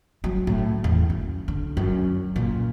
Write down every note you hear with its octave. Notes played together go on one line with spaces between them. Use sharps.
F#3
A2
E2
F#2
D3
F#2
A#2